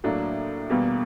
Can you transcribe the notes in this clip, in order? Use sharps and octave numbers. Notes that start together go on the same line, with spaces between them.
A2 F#3 A#3 D4
E2 B2 G3 A#3